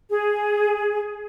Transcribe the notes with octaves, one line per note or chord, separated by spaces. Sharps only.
G#4